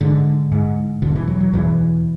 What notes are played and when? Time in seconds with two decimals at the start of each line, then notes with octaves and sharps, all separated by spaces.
0.01 G#2 D3
0.52 G#2
1.02 E2 B2 D3
1.15 E3
1.27 F#3
1.40 F#3
1.53 E2 B2 E3